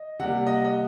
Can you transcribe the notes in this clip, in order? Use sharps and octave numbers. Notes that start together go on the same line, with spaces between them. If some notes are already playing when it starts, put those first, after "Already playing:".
Already playing: D#5
C3 G3 A#3 F#5
D#5
D#5